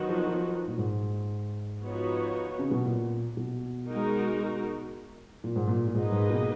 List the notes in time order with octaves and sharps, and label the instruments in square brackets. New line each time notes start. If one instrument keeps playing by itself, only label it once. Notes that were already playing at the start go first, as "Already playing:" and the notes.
Already playing: [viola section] D#3 F#3 B3 D#4 F#4
[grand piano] F3
F3
A#2
G#2
[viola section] F3 B3 D#4 F#4 C#5
[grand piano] C#3
B2
A#2
B2
[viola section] G#3 D#4 F#4 A#4
[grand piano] A#2
G#2
A#2
A#2
[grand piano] G#2 [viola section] A#3 D#4 G#4 B4 D#5
[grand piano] G#2
B2